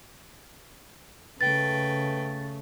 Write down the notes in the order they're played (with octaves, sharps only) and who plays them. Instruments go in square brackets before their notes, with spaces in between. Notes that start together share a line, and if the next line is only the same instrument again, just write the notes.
[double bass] C#3 A3 [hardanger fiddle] B4 G5 [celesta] A6